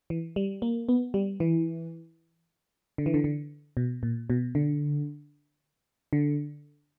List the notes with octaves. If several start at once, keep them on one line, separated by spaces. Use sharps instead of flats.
E3
G3
A#3
B3
G3
E3
D3
E3
D3
D3
B2
A#2
B2
D3
D3